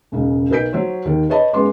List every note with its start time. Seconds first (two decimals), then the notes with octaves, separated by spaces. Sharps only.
0.12 E1 C#2 C#3
0.50 B1 A#4 B4 G6 B6 D7
0.73 F#3 C5 C#5
1.05 D#2 D#3
1.30 B4 C#5 D#5 A5 B5
1.53 F#2 G#3 B3 C6 D6